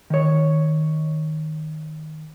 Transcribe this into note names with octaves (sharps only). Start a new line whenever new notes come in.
D#3 C#5